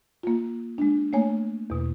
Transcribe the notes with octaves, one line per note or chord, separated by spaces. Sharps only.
A#3 F4
G#3 D4
A3 A#3 C#5 G#5
E2 B2